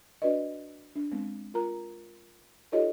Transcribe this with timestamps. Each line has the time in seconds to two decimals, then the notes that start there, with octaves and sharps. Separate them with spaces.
0.22 D4 F#4 B4 D5 D#5
0.96 D4
1.11 G#3 B3 C4
1.54 F4 A#4 A#5
2.72 D#4 F4 G4 A4 C#5 D#5